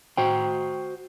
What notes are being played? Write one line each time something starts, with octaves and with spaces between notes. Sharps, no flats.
F#4 C5 G5